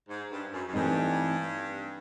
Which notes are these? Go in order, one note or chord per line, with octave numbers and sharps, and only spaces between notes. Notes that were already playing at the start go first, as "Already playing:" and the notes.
G#2
G2
F#2
F#2
G2 E3 A3 C4 D#4